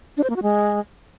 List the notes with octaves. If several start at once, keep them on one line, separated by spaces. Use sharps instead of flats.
D4
C5
A#3
F#4
G#3